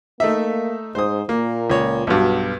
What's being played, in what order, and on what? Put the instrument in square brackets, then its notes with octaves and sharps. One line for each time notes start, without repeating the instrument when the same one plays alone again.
[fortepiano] A3 D#4 E5 [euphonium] A#3
[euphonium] G#2 [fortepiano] C5 D#6
[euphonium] A#2 [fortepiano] A#3
[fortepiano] C#2 C#5
[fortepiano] B1 G2 [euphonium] F#4